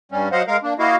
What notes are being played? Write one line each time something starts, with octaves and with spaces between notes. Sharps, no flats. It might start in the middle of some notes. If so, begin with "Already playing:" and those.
G2 G3 C#4
F#3 C5 D#5 F5 F#5
G#3 A#4 F5
A#3 D4
A#3 E4 F#4 D#5 F5